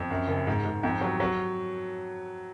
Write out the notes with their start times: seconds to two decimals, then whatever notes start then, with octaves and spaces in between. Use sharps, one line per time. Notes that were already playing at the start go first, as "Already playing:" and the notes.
Already playing: F2
0.10 F#2
0.28 F#1
0.47 G#2
0.65 G#2
0.83 F2
1.01 F#3
1.20 F#3